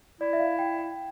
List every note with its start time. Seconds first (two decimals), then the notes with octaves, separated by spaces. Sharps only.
0.21 E4 D5
0.33 E5
0.39 F5
0.59 G5
0.78 G5